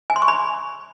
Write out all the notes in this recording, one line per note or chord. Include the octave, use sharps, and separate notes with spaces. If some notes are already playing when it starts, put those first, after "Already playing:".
G#5
C6
C#6
B5